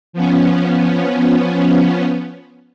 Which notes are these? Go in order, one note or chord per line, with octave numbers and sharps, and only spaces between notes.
F3 B3 C#4